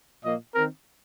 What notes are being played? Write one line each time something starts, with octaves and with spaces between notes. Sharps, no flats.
A#2 F3 A#3 D#5
D#3 C4 A#4